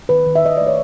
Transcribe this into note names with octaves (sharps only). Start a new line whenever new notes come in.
D#3 B4
D#3
E5
D#3 D#5
A3 D5
C#5